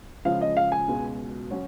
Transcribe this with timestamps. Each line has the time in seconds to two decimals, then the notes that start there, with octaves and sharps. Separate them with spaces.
0.25 C#3 F3 G#3 F5
0.41 D#5
0.57 F5
0.72 G#5
0.88 C#2 B2 G#3
1.51 F#3 C#4 F#4 C#5